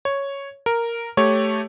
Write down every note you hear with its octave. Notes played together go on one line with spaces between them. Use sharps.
C#5
A#4
A3 G4 C#5